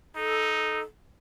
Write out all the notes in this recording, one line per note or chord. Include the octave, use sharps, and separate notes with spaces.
D#4 A4